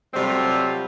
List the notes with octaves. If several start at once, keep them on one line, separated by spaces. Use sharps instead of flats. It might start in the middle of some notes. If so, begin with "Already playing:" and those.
C3 F#3 G3 A3 C4 F4